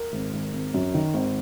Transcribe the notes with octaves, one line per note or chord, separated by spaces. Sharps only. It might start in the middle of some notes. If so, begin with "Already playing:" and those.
Already playing: A#4
G#1
G#1
G#1
F#2
D#3
G#1